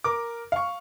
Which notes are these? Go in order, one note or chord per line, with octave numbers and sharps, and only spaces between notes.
A#4 D6
F5 C#6